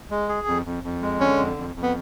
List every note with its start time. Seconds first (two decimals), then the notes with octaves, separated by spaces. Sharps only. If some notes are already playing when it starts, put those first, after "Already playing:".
0.11 G#3
0.29 G#4
0.48 F2
0.66 F2
0.84 F2
1.02 G#3
1.20 D3 C#4
1.38 F2
1.57 F2
1.76 F2
1.83 B3